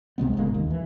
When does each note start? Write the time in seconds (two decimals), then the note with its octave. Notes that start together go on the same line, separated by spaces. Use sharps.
0.18 C#2 C3 G#3 B3
0.37 F#1 A2 G#3 A#3
0.54 D#2
0.70 E3